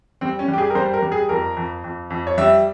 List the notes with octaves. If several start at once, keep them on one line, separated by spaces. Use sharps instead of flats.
G3 C4
C#4
G3
G4
G#4
A#4
G3 C5
A#4
G3
G#4
F2 A#4
F2
F2
F2
C#5
G3 E5